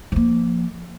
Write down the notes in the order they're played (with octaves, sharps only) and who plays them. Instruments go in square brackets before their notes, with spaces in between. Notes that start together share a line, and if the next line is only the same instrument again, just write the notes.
[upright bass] F3 A#3